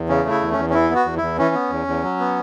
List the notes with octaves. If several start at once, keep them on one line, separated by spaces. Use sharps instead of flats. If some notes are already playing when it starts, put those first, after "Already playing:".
Already playing: E2
C#3 C#4
A3
E4
E2
C#4
E2
C#4
E3 E4
B3
F#4
E2
E2 E4
E3 C#4
B3
E2
E2
F#3
B3